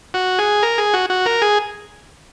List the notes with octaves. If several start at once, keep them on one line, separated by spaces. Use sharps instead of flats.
F#4
G#4
A#4
G#4
F#4
F#4
A#4
G#4